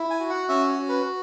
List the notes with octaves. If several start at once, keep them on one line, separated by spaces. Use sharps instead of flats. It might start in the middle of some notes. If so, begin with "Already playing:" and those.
Already playing: E4
G#5
F#4
F#5
C#4 E5
C#5
F#4
B4